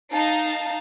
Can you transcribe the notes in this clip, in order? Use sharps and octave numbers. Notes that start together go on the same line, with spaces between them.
D#4 F5 A5